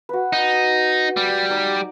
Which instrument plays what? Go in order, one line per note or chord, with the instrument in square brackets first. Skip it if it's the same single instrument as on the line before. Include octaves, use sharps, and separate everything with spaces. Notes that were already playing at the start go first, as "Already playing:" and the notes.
[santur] F#4 B4
[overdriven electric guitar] D#4
G3
[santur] D#4 D5